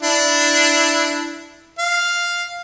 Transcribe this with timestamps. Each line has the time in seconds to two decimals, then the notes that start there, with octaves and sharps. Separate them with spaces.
0.03 D4 E4
1.79 F5